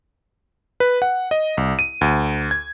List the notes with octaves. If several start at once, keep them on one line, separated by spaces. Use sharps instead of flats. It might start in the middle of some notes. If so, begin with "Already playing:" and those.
B4
F#5
D#5
C2
D#7
D2
G#6